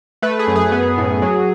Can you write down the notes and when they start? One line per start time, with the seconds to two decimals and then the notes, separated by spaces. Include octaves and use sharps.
0.22 A3 B4
0.39 G#4
0.48 F#2
0.56 G#4
0.72 B3
0.98 A2
1.22 F#3